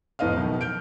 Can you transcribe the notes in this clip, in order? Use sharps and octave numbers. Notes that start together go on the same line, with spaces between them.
F1 A2 B3 D#5 F5 F6
B1 B2 D#3
F6 G6 D7